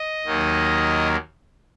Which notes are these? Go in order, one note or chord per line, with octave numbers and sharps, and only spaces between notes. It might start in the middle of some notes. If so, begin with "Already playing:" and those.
Already playing: D#5
D#2 D#3 F#3 A#3